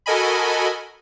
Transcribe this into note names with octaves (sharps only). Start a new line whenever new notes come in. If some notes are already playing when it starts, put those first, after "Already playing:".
F#4 A4 A#4 D#5 G#5 B5